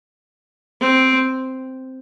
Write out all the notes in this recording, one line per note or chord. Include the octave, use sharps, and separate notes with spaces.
C4